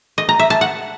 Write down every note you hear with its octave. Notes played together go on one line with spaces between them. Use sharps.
D#5
A#5
E5
A5
F#5